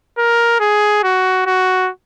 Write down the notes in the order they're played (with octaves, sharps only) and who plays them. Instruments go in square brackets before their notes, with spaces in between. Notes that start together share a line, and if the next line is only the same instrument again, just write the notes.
[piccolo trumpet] A#4
G#4
F#4
F#4